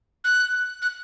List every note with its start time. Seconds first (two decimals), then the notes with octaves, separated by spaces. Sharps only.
0.24 F#6
0.82 F#6